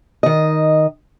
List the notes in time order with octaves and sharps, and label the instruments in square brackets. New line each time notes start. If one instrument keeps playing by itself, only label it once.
[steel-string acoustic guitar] D#3 D#5